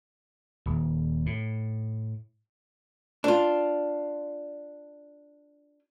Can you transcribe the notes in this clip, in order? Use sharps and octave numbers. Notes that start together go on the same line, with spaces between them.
D#1
A2
D4 F4